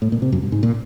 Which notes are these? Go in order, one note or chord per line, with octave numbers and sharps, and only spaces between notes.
A2
A#2
C3
F#2
G2
G#2
A#2